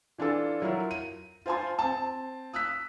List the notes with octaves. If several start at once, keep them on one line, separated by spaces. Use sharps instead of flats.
E3 D4 F4 A4
F#3 E4 F4 A#4
D#7
F4 C5 G#5 A5 C6
C4 A5
D#6 E6 F#6 B6